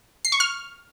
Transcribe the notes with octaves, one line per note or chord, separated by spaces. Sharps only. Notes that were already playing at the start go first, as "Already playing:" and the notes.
C7
C#6
F6